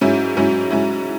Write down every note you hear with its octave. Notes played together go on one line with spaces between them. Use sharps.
G#2 F#3 C#4 E4
G#2 F#3 C#4 E4
G#2 F#3 C#4 E4